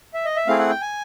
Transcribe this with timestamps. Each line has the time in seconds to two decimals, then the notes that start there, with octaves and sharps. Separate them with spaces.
0.14 E5
0.25 D#5
0.36 E5
0.47 A3 C4 E4 G#4 F5
0.59 F#5
0.70 G5
0.81 G#5